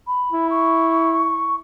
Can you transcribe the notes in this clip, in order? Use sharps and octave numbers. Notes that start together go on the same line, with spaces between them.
B5
E4
C#6